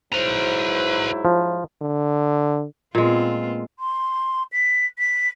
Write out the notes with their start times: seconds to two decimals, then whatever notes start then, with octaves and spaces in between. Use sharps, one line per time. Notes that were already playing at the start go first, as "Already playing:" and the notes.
0.13 G#2 F#3 E4 B4 C5 A#5
1.25 F3
1.82 D3
2.95 A#2 G#3 B3 C4 F4
3.79 C6
4.52 B6
4.99 B6